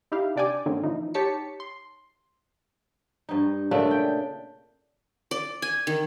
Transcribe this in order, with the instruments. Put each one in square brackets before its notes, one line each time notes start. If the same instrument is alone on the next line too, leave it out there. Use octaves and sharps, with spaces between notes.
[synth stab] D#4 E4 G4 F5
C3 D4 D5 G5 G#5 D6
G#2 D3 D#3 A#3 C4 C#4
A#2 E3 F3 D#4
D#4 G4 C#5 A5 B6 C#7
C6
[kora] G2 D#4
A#2 C#3 A3 D4
G5
[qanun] D5
G#5
D#3